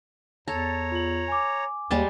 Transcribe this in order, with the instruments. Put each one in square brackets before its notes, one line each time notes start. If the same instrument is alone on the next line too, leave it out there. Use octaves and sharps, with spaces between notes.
[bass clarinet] E2 [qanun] A4 [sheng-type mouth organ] C#5 A#5
[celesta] F4 F#7
G#5 D6
[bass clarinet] D#2 [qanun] G3 G#3 A5